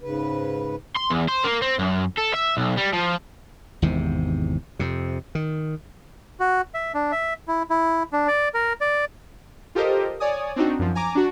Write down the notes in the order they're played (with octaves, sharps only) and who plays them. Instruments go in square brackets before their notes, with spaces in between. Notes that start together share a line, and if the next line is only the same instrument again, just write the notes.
[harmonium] G#2 C#3 B4
[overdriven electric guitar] C6
E2
C5
A#3
C4
F#2
A4
E5
B1
G3
F3
[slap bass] G#1 E2 G#2 C3
F2 C3
D#3
[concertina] F#4
E5
D4
E5
E4
E4
D4
D5
A#4
D5
[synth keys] F4 G4 A4 A#4 C5 D#5
C#5 D5 G#5 D#6
C4 D4 D#4 F#4
F#2 F3
G#5 A#5 D6
D4 F#4